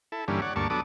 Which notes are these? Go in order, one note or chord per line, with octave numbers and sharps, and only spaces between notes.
E4 A4
G2 D3 E3 G3 A#3 C#4
C#5 D5 F#5
D2 G2 A#3 D5 A5 C#6
F#3 B3 D4 A4 D6 D#6